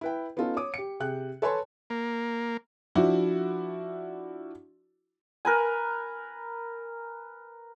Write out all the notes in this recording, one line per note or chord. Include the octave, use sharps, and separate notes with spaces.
E4 B4 G5
B3 C#4 D#4 F4 A4
C#5 D6 D#6
G4 C#7
C3 G#4 G5 F#6
A4 B4 C#5 G#5 A5 C6
A#3
F3 D4 E4 F#4
A#4 B4 G#5